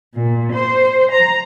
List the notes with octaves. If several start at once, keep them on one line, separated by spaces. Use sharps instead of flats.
A#2
C5
A#5